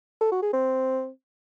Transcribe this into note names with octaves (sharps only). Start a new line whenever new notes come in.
A4
F#4
G#4
C4